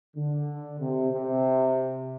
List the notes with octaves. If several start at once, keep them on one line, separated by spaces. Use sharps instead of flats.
D3
C3
C3